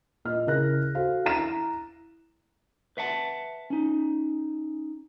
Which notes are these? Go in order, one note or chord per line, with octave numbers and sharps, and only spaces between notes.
A#2 D#5 F6
C#3 E4 A#4 F#6 A#6
F#4 A4 C5 F5
E4 A#5 E7
B4 E5 F#5 A5
C#4 D#4